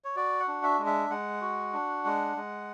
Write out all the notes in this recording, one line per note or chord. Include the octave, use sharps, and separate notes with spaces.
C#5
F#4 D5
F#5
D4
E5
G#3
E5
G#3 F#5
F#4
D4
G#3
G#3